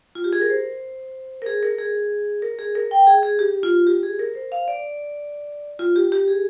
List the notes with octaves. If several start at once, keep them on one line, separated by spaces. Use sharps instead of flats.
F4
G4
G#4
A#4
C5
A#4
G#4
A#4
G#4
A#4
G#4
A#4
G5
G#4
G#4
G4
F4
G4
G#4
A#4
C5
F5
D5
F4
G4
G4
G#4